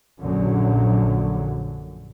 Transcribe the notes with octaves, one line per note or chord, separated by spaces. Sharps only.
A#1 F#2 A#2 D3 F#3